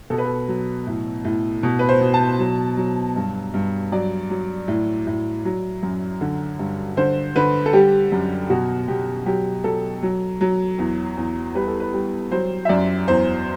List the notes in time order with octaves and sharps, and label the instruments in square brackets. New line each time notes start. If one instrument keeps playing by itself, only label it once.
[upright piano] B2 A4
B4
A4
F#3
A2
A2
B2
B4
C5
B2
A5
F#3
F#3
G2
G2
F#3 D5
F#3
A2
A2
F#3
F#2
D3
G2
D3 C5
D3 B4
A4
G3 G4
F#2
B2 F#4
B2 G4
F#3 G4
F#3 A4
F#3
F#3
E2
E2
G3 B4
A4
B4
G3
F#3 C5
E5
F#2 D5
E2 C5